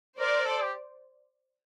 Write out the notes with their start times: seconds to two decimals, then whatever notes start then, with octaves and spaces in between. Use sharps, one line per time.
0.20 A#4 C5 D5
0.46 A4
0.62 G4